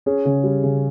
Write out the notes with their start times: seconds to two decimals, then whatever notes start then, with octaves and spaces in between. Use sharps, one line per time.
0.06 C#4 G#4
0.25 C#3
0.44 G3
0.63 C#3